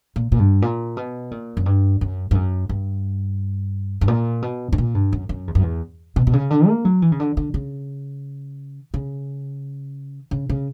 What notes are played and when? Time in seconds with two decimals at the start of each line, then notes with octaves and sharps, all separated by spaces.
0.16 A#2
0.32 A#2
0.39 G2
0.62 A#2
0.97 B2
1.31 A#2
1.57 F#2
1.66 G2
2.01 F#2
2.31 G2
2.35 F#2
2.69 G2
4.01 G2
4.08 A#2
4.42 B2
4.73 G2
4.78 A#2
4.95 G2
5.13 F#2
5.29 F#2
5.47 E2
5.55 F#2
5.63 E2
6.16 B2
6.27 B2
6.33 C#3
6.50 D3
6.68 A#3
6.85 F#3
7.02 E3
7.12 C#3
7.20 D3
7.37 D3
7.54 C#3
8.94 C#3
10.31 C#3
10.49 C#3